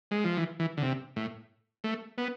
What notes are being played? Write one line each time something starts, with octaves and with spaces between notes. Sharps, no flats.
G#3
F3
E3
E3
D3
C3
A2
A3
B3